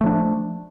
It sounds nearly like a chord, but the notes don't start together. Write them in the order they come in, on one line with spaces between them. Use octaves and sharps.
A3 F3 D4